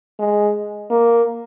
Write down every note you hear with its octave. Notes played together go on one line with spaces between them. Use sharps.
G#3
A#3